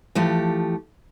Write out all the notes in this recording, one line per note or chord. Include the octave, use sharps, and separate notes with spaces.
E3 F3 A3 G4